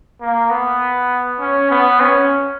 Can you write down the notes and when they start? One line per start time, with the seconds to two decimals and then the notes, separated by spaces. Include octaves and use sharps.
0.21 A#3
0.50 B3
1.40 C#4
1.71 B3
2.00 C#4